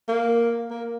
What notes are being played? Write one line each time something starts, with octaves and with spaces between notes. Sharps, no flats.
A#3
A#3